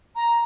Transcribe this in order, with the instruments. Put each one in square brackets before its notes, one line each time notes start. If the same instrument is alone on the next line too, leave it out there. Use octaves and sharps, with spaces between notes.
[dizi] A#5